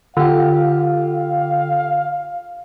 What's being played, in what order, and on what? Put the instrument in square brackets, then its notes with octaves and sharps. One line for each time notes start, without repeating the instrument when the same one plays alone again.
[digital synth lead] D3 [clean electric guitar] F4 G4 [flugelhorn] F5